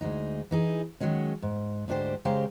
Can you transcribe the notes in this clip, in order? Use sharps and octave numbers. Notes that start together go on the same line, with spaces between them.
D2 G#3 D#4
E3 D#4 G#4
D#3 E3 F#3 G#3 C#4
G#2
D2 G#2 D4 G4 C5
C#3 G#3 G4 C5 F5 A#5